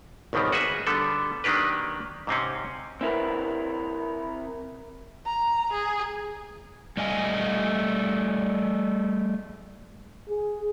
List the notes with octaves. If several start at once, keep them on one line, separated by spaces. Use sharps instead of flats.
G#1 C#2 B2 D#3 G3
F#4 G#4 B4 E5
D3 G3 B3 A4
D#3 F#3 A#3 D4 G4 B4
G#2 C3 C4 C#4
C4 E4 A#4 B4
A#5
G#4
G3 A3 D#5 F5 G#5
G#4